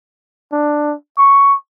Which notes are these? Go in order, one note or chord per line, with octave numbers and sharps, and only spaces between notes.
D4
C#6